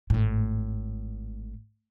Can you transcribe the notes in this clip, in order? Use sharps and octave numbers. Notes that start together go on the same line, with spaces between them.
G#1 A2